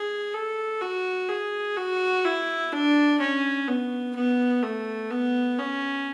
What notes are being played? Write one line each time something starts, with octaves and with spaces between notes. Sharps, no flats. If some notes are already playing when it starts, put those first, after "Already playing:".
Already playing: G#4
A4
F#4
G#4
F#4
E4
D4
C#4
B3
B3
A3
B3
C#4